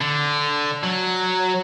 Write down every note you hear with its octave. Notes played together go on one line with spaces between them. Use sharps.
D3
F#3